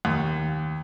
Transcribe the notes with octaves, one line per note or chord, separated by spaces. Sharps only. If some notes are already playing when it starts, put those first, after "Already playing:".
D#2